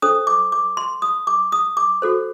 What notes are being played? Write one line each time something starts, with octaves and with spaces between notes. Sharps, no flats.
D4 A4 C5 D#6
D6
D6
C6
D#6
D6
D#6
D6
F#4 A4 C5